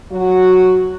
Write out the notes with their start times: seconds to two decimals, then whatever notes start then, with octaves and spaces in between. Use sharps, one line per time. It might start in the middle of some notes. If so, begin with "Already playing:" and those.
0.11 F#3 F#4